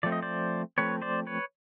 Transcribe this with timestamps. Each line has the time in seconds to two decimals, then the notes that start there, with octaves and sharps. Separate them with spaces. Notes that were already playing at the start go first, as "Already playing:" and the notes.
0.03 F3 A3 C4 D5
0.12 D#5
0.22 C5 D5
0.78 F3 A3 C4 B4 C#5
1.02 C5 D5
1.27 B4 C#5